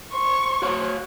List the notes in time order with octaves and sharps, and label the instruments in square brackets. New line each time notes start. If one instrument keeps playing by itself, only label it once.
[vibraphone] C5 C6 [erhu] C#6
[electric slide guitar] F#4 C#5 F5